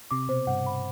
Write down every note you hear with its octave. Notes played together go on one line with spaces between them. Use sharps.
C3 D6
B2 C5
G2 F#5
B5